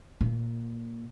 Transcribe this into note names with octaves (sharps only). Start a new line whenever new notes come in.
A#2